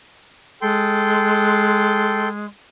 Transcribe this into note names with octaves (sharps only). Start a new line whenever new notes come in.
G#3 A4 G5 C6